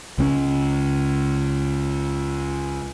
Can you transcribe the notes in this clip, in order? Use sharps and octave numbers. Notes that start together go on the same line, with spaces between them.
C#2 C4 C#4